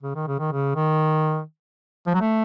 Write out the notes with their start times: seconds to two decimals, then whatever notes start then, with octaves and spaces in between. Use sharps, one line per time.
0.03 C#3
0.15 D#3
0.27 C#3
0.39 D#3
0.52 C#3
0.75 D#3
2.07 F3
2.14 F#3
2.21 A3